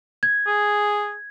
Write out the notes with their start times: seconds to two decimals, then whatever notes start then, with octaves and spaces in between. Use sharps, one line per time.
0.23 G#6
0.47 G#4